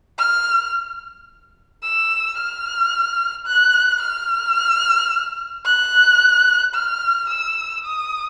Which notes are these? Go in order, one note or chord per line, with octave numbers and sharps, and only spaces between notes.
F6
E6
F6
F#6
F6
F#6
F6
E6
D#6